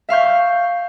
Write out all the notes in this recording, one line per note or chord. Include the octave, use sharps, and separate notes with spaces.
E5 F5 C#6 G6